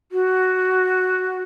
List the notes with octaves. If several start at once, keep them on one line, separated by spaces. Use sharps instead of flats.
F#4